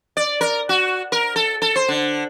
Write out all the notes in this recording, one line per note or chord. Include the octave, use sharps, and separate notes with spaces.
D5
A#4
F#4
A#4
A4
A4
C5
D3